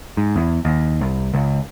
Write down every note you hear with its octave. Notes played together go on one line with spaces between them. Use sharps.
G#2
E2
D#2
C2
C#2